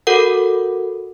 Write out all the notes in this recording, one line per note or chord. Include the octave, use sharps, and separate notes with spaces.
F#4 A4 A#4 F#5